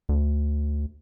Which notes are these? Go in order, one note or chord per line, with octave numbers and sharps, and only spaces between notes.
D2